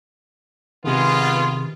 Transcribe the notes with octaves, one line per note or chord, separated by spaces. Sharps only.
C3 D#3 G#3 B3 F4